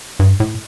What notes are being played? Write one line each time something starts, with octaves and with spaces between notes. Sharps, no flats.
G2
A2